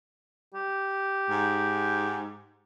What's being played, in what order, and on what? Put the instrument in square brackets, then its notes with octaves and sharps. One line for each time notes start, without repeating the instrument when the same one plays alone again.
[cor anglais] G4
[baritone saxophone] G#2